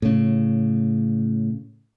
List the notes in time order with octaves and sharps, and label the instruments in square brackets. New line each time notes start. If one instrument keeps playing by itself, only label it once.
[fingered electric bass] A2 C#3